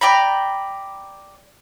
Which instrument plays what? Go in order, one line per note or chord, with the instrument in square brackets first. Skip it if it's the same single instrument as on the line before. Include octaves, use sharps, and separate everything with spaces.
[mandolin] D5 G5 A#5 B5